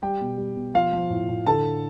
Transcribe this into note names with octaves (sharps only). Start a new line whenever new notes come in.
G3 G4 G5
B2
G3
B2
F3 F4 F5
F3
A2
A2
D3 A4 A5